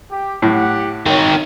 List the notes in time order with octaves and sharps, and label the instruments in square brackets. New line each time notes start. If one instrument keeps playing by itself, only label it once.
[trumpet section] G4
[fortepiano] A2 [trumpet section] G4 F#5
[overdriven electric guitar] D#3 C4 [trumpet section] C#5